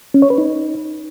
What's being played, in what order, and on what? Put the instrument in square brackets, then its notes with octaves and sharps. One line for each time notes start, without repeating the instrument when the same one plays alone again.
[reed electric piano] C#4
C#5
B4
D#4